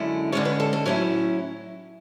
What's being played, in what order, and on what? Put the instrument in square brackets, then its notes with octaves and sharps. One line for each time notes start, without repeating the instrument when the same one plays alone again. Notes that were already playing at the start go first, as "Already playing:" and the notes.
Already playing: [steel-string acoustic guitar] F#2 D3 G#3 C#4 E4
D3 G#3 C#4 C#5
B4
A4
A4
A2 F#3 C#4 E4 C#5